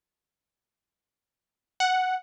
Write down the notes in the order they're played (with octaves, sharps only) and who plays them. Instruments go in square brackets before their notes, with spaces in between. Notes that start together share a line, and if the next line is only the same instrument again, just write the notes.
[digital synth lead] F#5